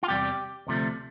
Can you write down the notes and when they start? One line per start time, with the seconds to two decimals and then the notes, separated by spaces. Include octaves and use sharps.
0.03 F4
0.08 E2 C3 G3 G4
0.67 D2 C3 F3 A3